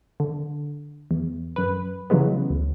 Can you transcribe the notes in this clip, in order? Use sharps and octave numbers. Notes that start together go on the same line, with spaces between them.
D3
E2
F#2 B4
C#3 E3 F#3 G#3 B3
D2